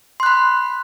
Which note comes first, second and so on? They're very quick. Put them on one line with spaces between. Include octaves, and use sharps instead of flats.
C6 F#6 B5